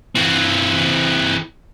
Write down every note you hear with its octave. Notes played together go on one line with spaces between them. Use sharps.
E3 C4